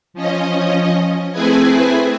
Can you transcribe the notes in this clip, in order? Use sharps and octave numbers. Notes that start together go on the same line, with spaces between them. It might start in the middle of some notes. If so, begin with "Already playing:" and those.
F3 C#4 D#5
A3 C4 E4 G#4 B4 G#5